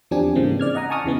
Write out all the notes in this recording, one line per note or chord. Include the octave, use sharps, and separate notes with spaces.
E2 F3 C4 D4 G4 G#5
G#2 C#3 E3 G#3 A#3 C4
D5 F6 G#6
D#5 F#5 A#5 D#6
G#5 A5 C#6 D#6 F6
E2 C#3 E3 B3